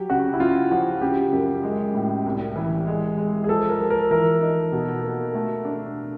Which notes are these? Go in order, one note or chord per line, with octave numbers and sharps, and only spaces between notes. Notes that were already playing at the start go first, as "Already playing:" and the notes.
Already playing: F#3 G4
C#3 F#4
E4
C#4 F4
F3 F#4
C#3 G4
F#2
G#3
A2
C2
E3
G#3
G#3
G#4
F3 A4
A#4
F3
A#4
E3 A#4
D#4
B2
A#3
A3
D4